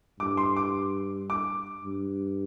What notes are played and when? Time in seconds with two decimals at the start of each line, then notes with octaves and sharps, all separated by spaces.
0.20 G2 D6
0.37 C6
0.57 D6
1.30 D6
1.84 G2